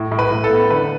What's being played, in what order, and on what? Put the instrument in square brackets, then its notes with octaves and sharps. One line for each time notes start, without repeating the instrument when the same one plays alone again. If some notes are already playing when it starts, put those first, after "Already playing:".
Already playing: [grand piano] A2
A2
B4
A2
A4
B3
D3 B4